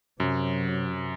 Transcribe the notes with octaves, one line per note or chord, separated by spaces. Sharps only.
F#2 C3 F#3